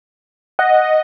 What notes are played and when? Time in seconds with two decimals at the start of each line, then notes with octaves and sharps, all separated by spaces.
0.59 D#5 F#5